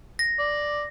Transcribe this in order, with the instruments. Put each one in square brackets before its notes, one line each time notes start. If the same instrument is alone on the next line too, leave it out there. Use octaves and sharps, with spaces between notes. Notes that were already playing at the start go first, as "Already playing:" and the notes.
[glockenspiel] A#6
[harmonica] D5